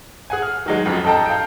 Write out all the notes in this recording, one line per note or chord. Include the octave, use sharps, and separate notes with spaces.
G#4 F#5 G#5
F6
D#3 F#3 G#3
F2 C#3 F3 F#3
A4 D#5 G5 A5 A#5
F5 G5